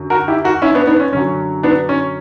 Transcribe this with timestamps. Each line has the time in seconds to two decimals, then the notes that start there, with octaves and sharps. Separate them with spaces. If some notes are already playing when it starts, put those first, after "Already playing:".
Already playing: F#2 D3 F#3
0.10 F#4 A#4
0.28 E4 G4
0.44 F#4 A#4
0.62 C#4 E4
0.74 B3 D4
0.87 B3 D4
1.00 C#4
1.12 F#2 D3 F#3 C#4
1.63 B3 D4
1.89 C#4